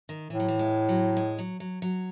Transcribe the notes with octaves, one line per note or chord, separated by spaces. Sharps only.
D#3
A2 E3
F#3
E3
G#3
F#3
G#3
F#3
F#3
F#3